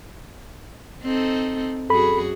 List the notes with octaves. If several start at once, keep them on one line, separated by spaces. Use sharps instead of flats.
C4 D#4 A4
F#2 F#4 G#4 A4 B5